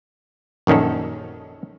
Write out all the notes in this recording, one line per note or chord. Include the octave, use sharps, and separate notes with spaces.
A#1 F#2 D#3 C#4 A4